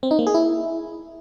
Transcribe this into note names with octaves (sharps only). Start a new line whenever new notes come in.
C4
D#4
A#3
G#4
E4